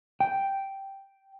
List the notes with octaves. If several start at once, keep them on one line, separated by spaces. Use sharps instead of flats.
G5